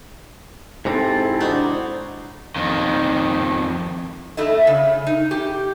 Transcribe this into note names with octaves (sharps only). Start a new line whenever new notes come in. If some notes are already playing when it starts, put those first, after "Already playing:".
G#2 C3 C4 E4 A4
D4 D#4 F#4 C5
F2 D#3
A3 E4 D#5
C#3
D#4
G4